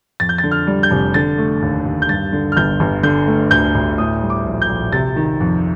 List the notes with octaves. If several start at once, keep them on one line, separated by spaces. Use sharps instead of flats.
F2 A6
G6
A6
D3
F6
G3
G6
F1
D3 A6
A3
D#2
D#2
G6
G2 A6
D3
F6
G1 G6
G1
D3 G6
A3
D2 G6
D2
A2 D#6
G3
D6
A#1
G6
A#1
C3 A6
D#3
F2